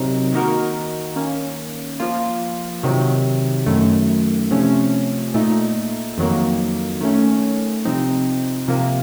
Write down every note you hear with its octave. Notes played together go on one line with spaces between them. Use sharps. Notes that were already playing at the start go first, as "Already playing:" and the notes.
Already playing: C3 F#3 C4 D#4 A#4
D#3 A#3 D#4 F#4 A#4
D#3 A#3 C#4
F3 A#3 F4
C3 D#3 F#3
F#2 D#3 A3
C3 F3 A3 C#4
A#2 A3 D#4
F2 D#3 F#3 A#3
D#3 A3 C#4
C3 F3 C4 D#4
C3 F3 A#3